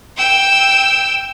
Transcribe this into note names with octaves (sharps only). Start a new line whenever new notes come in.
G5 E6